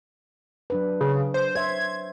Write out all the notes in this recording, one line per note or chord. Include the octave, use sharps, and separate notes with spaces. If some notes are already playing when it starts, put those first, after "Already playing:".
F#3 D4 B4
C#3
C5
C5 C#5 E5 G#6